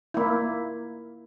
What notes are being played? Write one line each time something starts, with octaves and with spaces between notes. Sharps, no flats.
A#3 E4